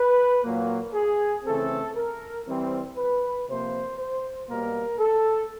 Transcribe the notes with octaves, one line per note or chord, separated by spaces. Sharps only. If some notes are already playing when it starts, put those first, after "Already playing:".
Already playing: B4
A#2 F#3 A#3
G#4
C#3 E3 A3 C4 A4
A#4
E3 G3 C4
B4
C3 F3 A#3 C5
C5
B2 G3 A#3 A#4
A4